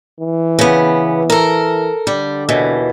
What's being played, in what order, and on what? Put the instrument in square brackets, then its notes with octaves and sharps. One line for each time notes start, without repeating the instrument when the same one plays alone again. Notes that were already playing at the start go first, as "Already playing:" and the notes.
[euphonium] E3
[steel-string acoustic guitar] C#3 B3
A4 A#4
[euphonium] D3 [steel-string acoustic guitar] G3
[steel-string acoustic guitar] D#2 B2 E3